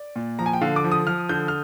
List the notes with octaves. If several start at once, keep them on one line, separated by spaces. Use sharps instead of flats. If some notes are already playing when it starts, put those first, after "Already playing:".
Already playing: D5
A#2
F3 A#5
G#5
G5
D3 F5
D6
F3
D#6
F3 F6
D3 G6
F6